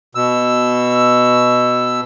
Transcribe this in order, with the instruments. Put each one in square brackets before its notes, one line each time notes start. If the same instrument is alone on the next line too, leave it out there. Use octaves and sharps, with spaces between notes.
[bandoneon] B2 E6